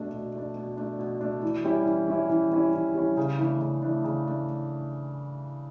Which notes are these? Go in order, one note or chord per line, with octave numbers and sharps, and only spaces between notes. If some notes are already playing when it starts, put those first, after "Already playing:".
Already playing: B2 A3 D4
B2
A3 D4
B2
A3 D4
B2
A3 D4
E3
G3 C#4 E4
E3
G3 C#4 E4
E3
G3 C#4 E4
E3
G3 C#4 E4
C#3
E3 A3 D4
C#3
E3 A3 D4
C#3
A3 D4